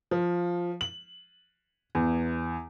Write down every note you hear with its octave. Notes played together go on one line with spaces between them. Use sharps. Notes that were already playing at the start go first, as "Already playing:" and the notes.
F3
F#7
E2